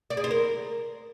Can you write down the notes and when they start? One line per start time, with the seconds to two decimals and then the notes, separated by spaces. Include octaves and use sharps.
0.10 D5
0.17 G#4
0.24 C5
0.31 A#4